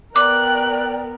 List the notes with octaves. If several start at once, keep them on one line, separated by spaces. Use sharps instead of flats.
B3 A#4 D5 G5 D6 F#6